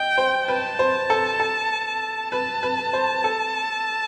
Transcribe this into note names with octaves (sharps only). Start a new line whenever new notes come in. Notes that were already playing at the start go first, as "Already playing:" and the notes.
Already playing: D#5 G5
C5
B4 A5
C5
A4
A4
B4 A5
B4
C5
A4